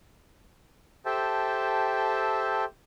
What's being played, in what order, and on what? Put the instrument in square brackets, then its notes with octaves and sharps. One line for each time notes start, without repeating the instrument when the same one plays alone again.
[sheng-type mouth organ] G4 A4 C5 E5 G5 A5